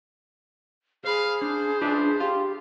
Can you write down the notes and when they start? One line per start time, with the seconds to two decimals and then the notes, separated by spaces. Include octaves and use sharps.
1.05 G#4 C5 F5 B5
1.42 D4 C5
1.81 D4 F4 B4 D5 E5
2.20 F4 G4